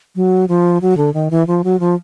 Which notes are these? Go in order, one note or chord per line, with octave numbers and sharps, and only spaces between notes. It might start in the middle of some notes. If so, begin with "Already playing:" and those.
F#3
F3
F#3
D3
D#3
E3
F3
F#3
F3